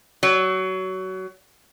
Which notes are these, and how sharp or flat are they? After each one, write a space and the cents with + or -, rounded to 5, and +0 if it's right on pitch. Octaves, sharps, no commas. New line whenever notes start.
F#3 +20